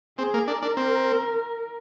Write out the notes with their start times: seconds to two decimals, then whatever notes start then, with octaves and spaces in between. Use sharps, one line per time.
0.18 C4 G#4
0.34 A#3
0.48 D4 A#4
0.62 D4
0.77 C4